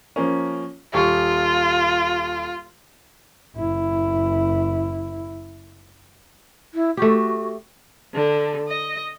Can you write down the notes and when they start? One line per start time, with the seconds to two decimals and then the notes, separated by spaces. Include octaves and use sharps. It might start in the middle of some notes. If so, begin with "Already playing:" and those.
0.16 F3 A#3 C#4
0.93 D#1 F4 G4 C#6
3.55 F#1 E4
6.74 E4
6.97 A3 F#4 G4
8.14 D3
8.68 D#5